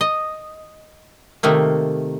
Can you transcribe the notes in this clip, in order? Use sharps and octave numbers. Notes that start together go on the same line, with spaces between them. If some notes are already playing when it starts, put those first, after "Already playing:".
D#5
C3 D#3 A3 A#3